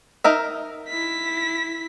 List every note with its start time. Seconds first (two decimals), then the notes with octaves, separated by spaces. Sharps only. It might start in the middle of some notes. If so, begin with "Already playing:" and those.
0.24 D#4 A#4 E5
0.88 E4 B6